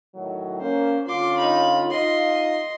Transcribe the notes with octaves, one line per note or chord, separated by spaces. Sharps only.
A2 D#3 F#3
A#3 C#4 C5
D3 C#4 F4 C6 D6
D#4 B5
D#4 F4 D#5 C6